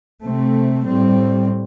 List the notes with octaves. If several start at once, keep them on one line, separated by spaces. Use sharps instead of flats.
C3 A3 C4
A2 G3 C4